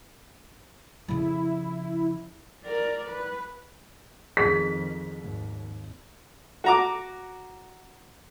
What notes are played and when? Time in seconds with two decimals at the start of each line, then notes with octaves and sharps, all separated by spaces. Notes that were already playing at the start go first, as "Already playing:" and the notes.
1.08 F2 C#3 E4
2.66 A#4 D5
3.09 B4
4.37 F2 D#3 G#4 B6
5.17 G#1 D#2
6.64 F#4 A#5 D6